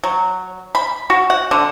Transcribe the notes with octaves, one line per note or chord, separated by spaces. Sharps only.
F#3
B5
F#4
F#5
D3